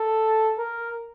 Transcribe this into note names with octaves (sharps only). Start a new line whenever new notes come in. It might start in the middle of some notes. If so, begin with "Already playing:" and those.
Already playing: A4
A#4